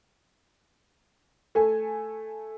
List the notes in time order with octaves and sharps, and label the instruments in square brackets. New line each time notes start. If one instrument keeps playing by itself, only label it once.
[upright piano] A3 A4 G#5